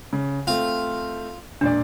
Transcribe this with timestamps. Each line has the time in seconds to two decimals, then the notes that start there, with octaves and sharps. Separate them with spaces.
0.13 C#3
0.47 A3 C4 F4
1.61 E1 A#2 D4 D5